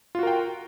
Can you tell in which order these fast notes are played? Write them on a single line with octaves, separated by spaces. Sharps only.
F4 F#4 A#4 G5